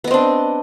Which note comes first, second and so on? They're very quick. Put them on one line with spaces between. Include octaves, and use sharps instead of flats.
B3 D#5 C4 D4